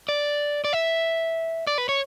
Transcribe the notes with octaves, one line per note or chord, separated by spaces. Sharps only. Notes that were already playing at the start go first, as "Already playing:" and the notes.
D5
D5
E5
D5
B4
C#5